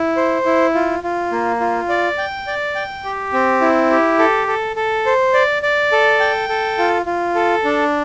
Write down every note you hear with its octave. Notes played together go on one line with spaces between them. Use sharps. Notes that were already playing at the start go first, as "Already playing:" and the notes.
Already playing: E4
C5
E4
F4
F4
A#3
F4
D5
G5
D5
G5
G4
C4
E4
G4
A4
A4
A4
C5
D5
D5
A4
G5
A4
F4
F4
A4
D4